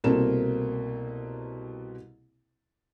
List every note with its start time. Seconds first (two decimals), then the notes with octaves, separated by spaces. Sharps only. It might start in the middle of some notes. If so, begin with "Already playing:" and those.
0.04 C2 B2 A#3 C4 A4 E7